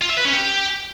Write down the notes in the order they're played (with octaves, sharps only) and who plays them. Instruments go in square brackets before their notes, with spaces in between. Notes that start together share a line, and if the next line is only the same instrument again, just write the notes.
[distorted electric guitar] F4
E5
B4
C#4
G4